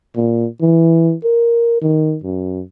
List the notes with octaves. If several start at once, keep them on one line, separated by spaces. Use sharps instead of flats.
A#2
E3
A#4
D#3
F#2